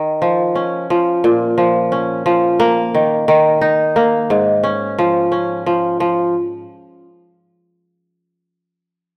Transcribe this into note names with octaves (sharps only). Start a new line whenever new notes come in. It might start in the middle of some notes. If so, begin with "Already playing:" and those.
Already playing: D#3
F3
C#4
F3
A#2
F3
C#4
F3
A#3
D#3
D#3
D#4
A#3
G#2
C#4
F3
C#4
F3
F3